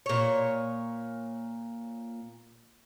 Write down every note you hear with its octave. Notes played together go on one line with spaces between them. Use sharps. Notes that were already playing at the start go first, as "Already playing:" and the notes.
A#2 C#5